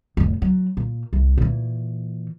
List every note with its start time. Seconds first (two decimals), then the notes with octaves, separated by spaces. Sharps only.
0.17 F1 A2
0.42 F#3
0.77 A#2
1.13 C2
1.38 A#2 E3